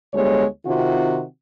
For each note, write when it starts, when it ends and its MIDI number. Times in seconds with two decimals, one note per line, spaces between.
0.14 0.45 38
0.14 0.45 55
0.14 0.45 56
0.14 0.45 59
0.14 0.45 73
0.66 1.23 48
0.66 1.23 51
0.66 1.23 60
0.66 1.23 65
0.66 1.23 66